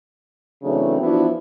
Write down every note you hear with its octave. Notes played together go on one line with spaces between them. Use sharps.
C#3 E3 F#3 A3 C4 D4
E3 F3 B3 D4 E4 F#4